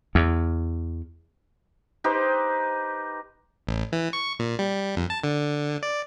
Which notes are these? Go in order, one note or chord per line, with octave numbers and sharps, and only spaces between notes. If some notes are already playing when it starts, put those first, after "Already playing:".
E2
D#4 G4 B4 C5
A1
E3
C#6
A#2
G3
F2
A5
D3
D5